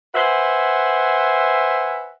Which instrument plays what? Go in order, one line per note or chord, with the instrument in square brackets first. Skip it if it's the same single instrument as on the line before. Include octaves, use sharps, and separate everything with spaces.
[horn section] B4 C5 E5 F#5 G#5